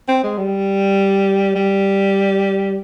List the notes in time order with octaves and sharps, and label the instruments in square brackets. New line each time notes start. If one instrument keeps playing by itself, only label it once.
[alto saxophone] C4
G#3
G3
G3